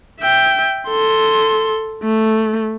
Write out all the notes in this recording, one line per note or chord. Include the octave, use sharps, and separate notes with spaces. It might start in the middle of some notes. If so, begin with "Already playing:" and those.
E5 G5
A4 C6
A3